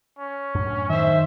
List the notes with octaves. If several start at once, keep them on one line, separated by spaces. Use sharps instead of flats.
C#4
F#2 A2 D4
D#3 C5 E5